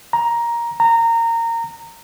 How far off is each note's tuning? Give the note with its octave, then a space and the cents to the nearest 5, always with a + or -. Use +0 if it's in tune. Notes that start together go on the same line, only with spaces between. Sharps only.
A#5 +10
A#5 -20